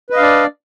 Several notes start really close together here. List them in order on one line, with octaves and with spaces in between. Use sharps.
B4 D#5 F5 D4 D5